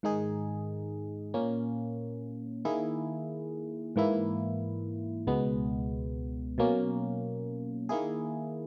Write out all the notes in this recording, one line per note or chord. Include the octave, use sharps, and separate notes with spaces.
G#2 D#3 G#3 D#4 G#4
A#2 A#3 C#4
D#3 A#3 E4 G#4
G#2 E3 A#3 E4
C#2 B2 G#3 B3
B2 F#3 A#3 C#4
D#3 A#3 E4 G#4